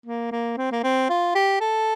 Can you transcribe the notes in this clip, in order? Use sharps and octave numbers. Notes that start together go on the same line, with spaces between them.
A#3
A#3
C4
A#3
C4
F4
G4
A4